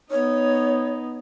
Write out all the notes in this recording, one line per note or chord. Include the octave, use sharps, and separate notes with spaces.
B3 D#4 C#5